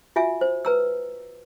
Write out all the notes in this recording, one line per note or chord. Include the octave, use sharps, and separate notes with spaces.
F4 F#4 E5 G#5
C5
B4 A#5 E6